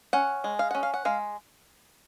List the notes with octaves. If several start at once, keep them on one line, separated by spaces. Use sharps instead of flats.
C#4 F#5
G#3
F5
C#4 F#5
F5
F#5
G#3 F5